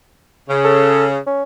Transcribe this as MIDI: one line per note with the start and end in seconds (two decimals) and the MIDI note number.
0.49 1.16 49
0.64 1.06 69
1.26 1.43 61